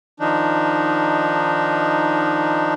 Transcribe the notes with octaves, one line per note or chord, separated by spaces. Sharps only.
D#3 F3 D4 D#4